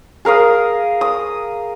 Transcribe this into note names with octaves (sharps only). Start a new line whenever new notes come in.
G#4 A#4 F5 D#6
D#6